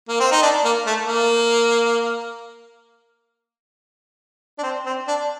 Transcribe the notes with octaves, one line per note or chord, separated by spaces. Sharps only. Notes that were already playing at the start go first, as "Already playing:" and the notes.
A#3
C4
D#4
D4
A#3
A3
A#3
D4
C4
C4
D4